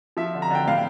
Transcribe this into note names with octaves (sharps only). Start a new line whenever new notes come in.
F3 E5
D3
A#5
D3 G5
A2 F5